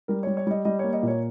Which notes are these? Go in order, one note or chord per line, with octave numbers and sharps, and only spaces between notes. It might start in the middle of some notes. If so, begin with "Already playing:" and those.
G3 A#4
G3 C#5
C#5
G3 D#5
G3 D#5
A#3 C#5
D#5
A#2
C#5